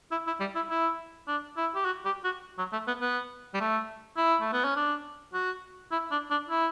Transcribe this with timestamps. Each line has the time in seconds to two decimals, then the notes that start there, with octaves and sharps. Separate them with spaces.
0.11 E4
0.27 E4
0.40 G3
0.55 E4
0.70 E4
1.28 D4
1.57 E4
1.75 G4
1.85 F#4
2.05 G4
2.24 F#4
2.58 F#3
2.72 A3
2.87 B3
3.01 B3
3.54 G3
3.60 A3
4.17 E4
4.41 A3
4.53 B3
4.65 C#4
4.76 D4
5.33 F#4
5.91 E4
6.11 D4
6.31 D4
6.49 E4